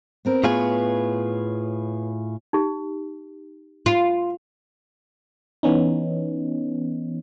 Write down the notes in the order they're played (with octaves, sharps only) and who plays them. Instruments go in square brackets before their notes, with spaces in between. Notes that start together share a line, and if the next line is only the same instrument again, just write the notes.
[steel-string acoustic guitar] B3 C4 A#4
[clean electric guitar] A2 F4 G#4 [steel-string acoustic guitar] B3 B4 C#5
[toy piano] D#4 G4
[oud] F4
[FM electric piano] E3 B3 C#4 D#4